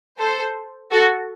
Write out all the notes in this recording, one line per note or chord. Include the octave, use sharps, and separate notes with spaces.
A4 C5
F#4 A4